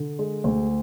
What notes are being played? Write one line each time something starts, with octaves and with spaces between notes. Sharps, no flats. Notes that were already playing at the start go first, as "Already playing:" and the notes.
Already playing: D3
G#3
D2